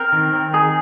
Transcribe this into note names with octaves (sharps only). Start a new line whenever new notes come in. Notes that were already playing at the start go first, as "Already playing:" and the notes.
Already playing: C4 A#4
D#3
C4
D#4 G#4